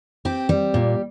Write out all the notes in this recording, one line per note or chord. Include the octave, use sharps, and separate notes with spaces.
C4 G4
G3
A#2